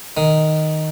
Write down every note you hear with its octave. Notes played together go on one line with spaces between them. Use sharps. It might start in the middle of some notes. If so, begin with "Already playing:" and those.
D#3